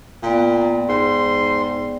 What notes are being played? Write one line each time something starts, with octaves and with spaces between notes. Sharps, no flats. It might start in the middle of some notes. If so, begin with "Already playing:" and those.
A#2 B3 D5 G5
G#2 C6